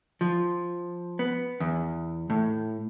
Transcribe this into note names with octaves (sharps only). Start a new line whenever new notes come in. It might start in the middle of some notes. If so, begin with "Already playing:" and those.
F3
B3
E2
A2